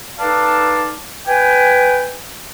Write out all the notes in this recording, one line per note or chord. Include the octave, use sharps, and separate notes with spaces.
D#4 A4 B4 D5 F5 A5
B4 G5 G#5